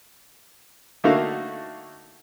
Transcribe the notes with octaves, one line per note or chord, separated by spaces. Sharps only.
D3 A3 A#3 D#4 F#4 F5